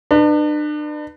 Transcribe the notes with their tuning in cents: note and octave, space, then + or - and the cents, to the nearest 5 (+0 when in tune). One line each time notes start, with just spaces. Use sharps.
D4 +40 B4 +0